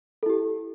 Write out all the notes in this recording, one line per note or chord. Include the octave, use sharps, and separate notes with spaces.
E4 G4 A4